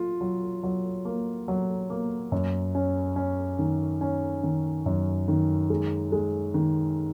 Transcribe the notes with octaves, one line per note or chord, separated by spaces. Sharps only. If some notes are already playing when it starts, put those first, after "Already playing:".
Already playing: F#3 F4
F#3
F#3
A#3
F#3
A#3
F#2
C#4
C#4
D#3
C#4
D#3
F#2
D#3
G#3
G#3
D#3